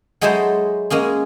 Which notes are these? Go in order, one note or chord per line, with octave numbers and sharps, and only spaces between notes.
F#3 G#3 D#4 E4 A4 C5
G#3 A#3 C#4 G#4